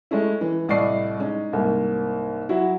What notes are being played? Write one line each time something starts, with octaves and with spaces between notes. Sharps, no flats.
G#3 A3 C#4 E4
E3
C2 A2 D5 D#5 C#6 C7
G#3 C#4 D#4
C2 G#2 A#3
F#3 E4 F#4